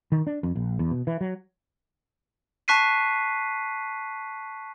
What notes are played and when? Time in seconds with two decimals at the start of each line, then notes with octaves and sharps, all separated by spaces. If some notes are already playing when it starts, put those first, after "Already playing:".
0.12 D#3
0.27 D4
0.43 F2
0.56 A#1
0.79 E2
0.91 B2
1.07 E3
1.21 F#3
2.68 A5 C#6 F#6 B6 C7 D#7